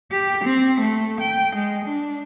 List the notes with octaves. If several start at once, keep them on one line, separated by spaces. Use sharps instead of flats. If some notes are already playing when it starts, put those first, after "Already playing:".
G4
C4
A3
G5
G#3
D4